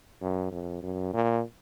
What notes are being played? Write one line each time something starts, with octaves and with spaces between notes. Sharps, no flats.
F#2
F2
F#2
A#2